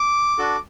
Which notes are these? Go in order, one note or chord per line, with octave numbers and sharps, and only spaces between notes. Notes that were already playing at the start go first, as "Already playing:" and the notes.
Already playing: D6
D4 F#4 A4